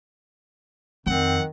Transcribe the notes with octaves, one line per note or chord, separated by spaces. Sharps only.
F2 D#3 C4 F#5